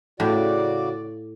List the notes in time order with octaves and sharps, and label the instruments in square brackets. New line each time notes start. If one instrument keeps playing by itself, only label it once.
[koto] A2 [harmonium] C#3 F#4 D5